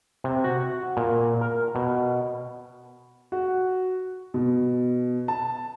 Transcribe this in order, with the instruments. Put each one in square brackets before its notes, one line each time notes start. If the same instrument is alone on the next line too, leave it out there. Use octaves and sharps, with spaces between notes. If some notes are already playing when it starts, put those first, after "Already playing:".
[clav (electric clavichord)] C3
F#4
A#2
A#4
B2
[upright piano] F#4
B2
A5